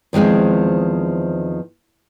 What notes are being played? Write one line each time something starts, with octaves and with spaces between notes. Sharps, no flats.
E2 D#3 F3 G#3 C4